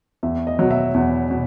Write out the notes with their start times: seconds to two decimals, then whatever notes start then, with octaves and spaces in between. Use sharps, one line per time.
0.23 E2 E5
0.47 D#5
0.59 B2 F#3
0.71 E5
0.94 E2
1.31 B2